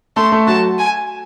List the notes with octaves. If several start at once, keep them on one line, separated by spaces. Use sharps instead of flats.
A3 A4 C6
A3 A4
F#3 F#4 A5
G#5